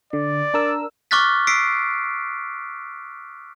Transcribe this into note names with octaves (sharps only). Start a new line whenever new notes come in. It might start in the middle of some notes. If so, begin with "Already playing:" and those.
D3 D5
D4 A#4 E6
C#6 D6 F6 F#6 A6 B6
E6 B6 C7 D7